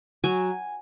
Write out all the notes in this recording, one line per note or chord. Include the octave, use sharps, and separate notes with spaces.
F#3 G#5